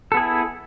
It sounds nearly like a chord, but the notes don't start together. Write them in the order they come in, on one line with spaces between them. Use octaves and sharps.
A4 B3 G#4 E4